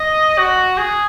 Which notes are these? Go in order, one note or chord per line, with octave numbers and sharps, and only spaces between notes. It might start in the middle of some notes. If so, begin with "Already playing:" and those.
Already playing: D#5
F#4
G#4